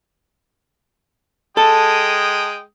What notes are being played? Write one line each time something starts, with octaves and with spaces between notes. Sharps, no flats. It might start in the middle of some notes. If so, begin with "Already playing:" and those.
G#3 A4 G5 D#6